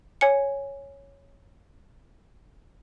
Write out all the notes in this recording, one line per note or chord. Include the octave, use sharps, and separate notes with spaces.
C#5 G#5 C#7